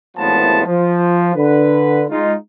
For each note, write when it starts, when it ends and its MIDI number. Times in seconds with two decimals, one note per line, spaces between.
0.18 0.62 32
0.18 0.62 40
0.18 0.62 45
0.18 0.62 53
0.18 0.62 59
0.18 0.62 81
0.67 1.31 53
1.35 2.05 50
1.35 2.05 71
2.10 2.34 56
2.10 2.34 63
2.10 2.34 65